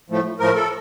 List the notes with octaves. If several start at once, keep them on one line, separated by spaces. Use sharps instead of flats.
A2 F3 A3
A2 F3 A3 A#4
A4